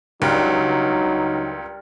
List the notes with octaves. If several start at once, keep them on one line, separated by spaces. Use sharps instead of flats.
C#2 F#3 G3 D4 D#4 A#4